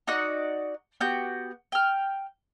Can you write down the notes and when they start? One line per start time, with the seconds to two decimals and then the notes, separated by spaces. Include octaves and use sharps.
0.07 D#4 F#4 D5 F#6
1.00 B3 F#4 G4 G6
1.72 G5 F6